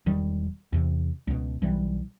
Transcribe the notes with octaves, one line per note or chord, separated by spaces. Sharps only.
E1 D#3 G3
E2 C3
C#2 B2
B1 E3 G3